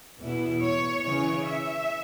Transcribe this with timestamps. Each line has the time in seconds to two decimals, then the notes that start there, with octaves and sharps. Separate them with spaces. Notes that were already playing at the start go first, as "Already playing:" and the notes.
0.21 E2 B2 B3 E4
0.63 C#5
1.06 C#3 E3 C#4 C#5
1.49 E5